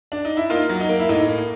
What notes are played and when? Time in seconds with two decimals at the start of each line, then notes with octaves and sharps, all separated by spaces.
0.12 D4
0.25 D#4
0.37 E4
0.50 A#3 D#4 F4
0.69 F#3
0.80 D#4
0.89 A#3
0.99 E4
1.09 A2 D#4
1.28 A#3